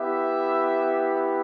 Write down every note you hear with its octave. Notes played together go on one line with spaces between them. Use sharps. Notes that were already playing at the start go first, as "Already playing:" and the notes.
Already playing: B3 E4 G4 E5